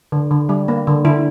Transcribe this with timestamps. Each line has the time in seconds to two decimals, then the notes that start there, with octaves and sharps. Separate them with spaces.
0.12 D3
0.31 D3
0.49 G3
0.68 A#3
0.87 D3
1.05 D3 E4